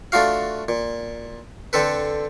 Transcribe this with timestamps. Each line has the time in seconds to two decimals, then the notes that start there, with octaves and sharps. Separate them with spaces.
0.12 A3 D4 F4 F#4 F5
0.69 A#2
1.73 D3 C4 A4 B4